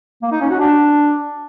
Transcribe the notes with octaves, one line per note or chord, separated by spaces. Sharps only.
A#3
D#4
C#4
F#4
D4